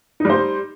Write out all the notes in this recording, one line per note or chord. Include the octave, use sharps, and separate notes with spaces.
G3 D#4 C5